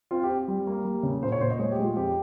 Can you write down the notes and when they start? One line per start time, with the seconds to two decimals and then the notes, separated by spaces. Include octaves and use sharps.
0.11 C4 F4
0.24 G4
0.29 C4
0.48 G3
0.67 A#3
0.85 G3
1.03 C#3
1.22 A#2 C5
1.32 C#5
1.41 A#2 C5
1.50 D#5
1.59 G#3 C#5
1.72 G4
1.78 G#3
1.84 F4
1.96 F2 G4